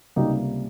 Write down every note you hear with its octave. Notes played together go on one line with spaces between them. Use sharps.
C#2 C3 G3 A#3 D#4 G4